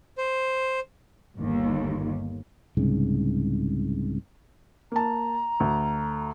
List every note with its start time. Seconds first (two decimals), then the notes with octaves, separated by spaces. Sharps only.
0.18 C5
1.37 G1 D#2
2.77 C2 G#2 C#3
4.92 A#3 A5 A#5
5.60 D2